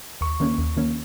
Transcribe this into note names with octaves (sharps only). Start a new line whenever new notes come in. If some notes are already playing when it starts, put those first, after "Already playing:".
D#2 C#6
D#3 A#3 C#4
D#2
D#3 A#3 C#4